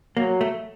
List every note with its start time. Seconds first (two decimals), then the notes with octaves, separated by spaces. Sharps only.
0.17 F#3 A#3
0.41 A3